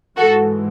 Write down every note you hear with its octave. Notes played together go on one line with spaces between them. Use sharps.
G#2 E3 G#3 F#4 A4